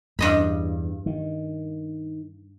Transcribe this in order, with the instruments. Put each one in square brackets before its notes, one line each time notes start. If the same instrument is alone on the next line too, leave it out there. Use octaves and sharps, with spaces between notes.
[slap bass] E2 [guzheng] G2 D#5 B5
[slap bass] D#3